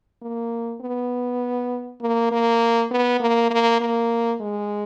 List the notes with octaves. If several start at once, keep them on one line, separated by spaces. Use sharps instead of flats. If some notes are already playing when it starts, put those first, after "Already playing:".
A#3
B3
A#3
A#3
B3
A#3
A#3
A#3
G#3